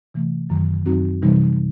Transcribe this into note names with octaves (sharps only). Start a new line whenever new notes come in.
C3 E3 A3
F#2 D#3 F#3
F#2 F#3 C4 D#4 F#4
C3 E3 G3 D#4